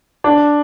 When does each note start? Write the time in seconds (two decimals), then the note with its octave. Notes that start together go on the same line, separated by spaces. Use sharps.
0.24 D4